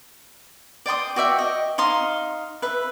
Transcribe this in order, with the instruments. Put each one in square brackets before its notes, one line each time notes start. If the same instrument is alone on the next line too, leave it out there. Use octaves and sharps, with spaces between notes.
[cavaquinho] D5 G5 C6 D#6
F#4 D5 E5 G5
D#5
D#4 F5 C6 D#6
B4 E5